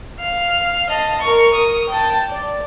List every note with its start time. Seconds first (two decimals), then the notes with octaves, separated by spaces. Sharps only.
0.20 F5
0.89 D#5 A5
1.21 A#4 C#6
1.54 A#4 D#6
1.89 G5 A5
2.30 D5